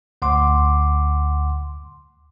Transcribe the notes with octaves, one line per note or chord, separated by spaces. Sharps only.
D2 F#5 C6 D6